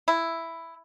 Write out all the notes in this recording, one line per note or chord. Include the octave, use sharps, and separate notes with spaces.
E4